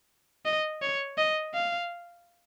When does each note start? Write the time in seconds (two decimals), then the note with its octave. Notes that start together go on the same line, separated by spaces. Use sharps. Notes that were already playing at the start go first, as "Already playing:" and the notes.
0.45 D#5
0.82 C#5
1.18 D#5
1.54 F5